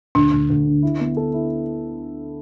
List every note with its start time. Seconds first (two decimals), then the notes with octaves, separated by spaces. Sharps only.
0.15 D2 D4
0.33 D2
0.50 D2
0.66 D3
0.83 E4
1.00 B3
1.17 A4
1.34 E4